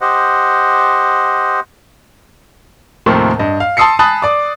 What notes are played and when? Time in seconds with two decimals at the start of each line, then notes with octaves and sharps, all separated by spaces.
0.01 G4 C5 D#5 F#5
3.06 D#2 A2 C3 D#3 F3 C4
3.39 G2 D#5
3.60 F5
3.77 A5 C6 D#6 E6 C7 C#7
3.99 G#5 A5 B5 D#6 F#6 A6
4.22 D5 D6